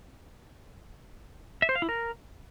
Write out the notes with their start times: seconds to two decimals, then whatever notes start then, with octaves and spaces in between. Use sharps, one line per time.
1.62 E5
1.69 C5
1.76 F5
1.82 E4
1.89 A#4